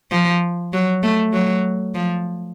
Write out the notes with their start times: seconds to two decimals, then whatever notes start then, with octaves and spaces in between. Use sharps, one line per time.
0.11 F3
0.73 F#3
1.03 A3
1.33 F#3
1.95 F3